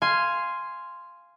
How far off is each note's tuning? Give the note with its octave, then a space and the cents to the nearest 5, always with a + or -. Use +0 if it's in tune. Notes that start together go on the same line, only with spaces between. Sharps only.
F5 -10 G#5 +0 C6 -5